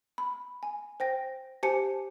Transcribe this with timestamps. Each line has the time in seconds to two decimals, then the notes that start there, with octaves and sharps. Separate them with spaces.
0.18 B5
0.63 G#5
1.00 C5 G5 A#6
1.63 G4 C5 G#5 A5 C#7